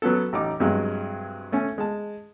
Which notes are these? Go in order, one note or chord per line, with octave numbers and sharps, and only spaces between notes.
F#3 B3 C#4 A4
A1 D#4 D6
G2 C3 F#3 G#3
A3 C#4 G#5
G#3 A5